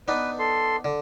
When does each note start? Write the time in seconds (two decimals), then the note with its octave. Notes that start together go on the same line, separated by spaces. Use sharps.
0.08 B3 D4 D#4 B4
0.39 A4 C6
0.85 D3